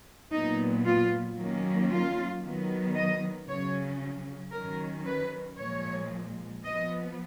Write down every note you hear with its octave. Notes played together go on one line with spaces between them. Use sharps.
A#2 F#3 B3 D#4
F4
D#3 F#3 A#3 C#4
F4
D#3 F#3 B3
D#5
C#3 F#3 C#4 C#5
D#3 F#3 C#4 A#4
B4
A#2 F3 G#3 C#5
F3 B3 D#5